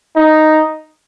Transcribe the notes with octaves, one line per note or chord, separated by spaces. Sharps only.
D#4